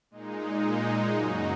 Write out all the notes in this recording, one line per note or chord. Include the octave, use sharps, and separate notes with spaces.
A#2 G#3 D#4
F#2 C#3 F#3 D#4 F#4